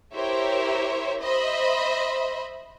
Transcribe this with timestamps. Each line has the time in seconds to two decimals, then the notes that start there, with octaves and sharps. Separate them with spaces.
0.14 E4 G4 A#4 C5 C#5 E5
1.21 C5 D#5 E5 B5